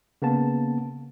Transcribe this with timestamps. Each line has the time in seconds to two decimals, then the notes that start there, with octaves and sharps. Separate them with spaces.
0.22 C#3 A#3 B3 A5